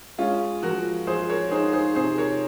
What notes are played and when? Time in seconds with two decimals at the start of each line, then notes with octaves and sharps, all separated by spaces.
0.18 G#3 C#4 F4
0.63 F3 F#4 A#4
1.07 F3 G#4 C5
1.29 A#4 C#5
1.51 D#4 G#4 C5
1.73 G#4 C5
1.95 C3 G#4 C5
2.18 A#4 C#5